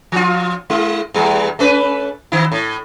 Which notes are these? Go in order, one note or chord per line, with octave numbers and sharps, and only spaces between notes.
F3 F4
G#3 E4
E2 G3
A3 C#4 B4
D#3 E4
A2